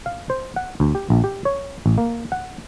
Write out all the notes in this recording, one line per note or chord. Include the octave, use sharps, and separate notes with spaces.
F5
C5
F#5
D2
G4
A#1
G4
C#5
A1
A#3
F#5